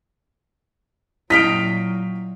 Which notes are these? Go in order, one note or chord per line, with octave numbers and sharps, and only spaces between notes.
A#2 F#3 E4 D#5 F5 G5 B6 D7